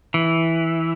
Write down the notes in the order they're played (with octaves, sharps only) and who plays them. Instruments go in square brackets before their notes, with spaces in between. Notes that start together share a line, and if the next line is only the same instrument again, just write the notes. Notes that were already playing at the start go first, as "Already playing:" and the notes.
[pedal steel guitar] E3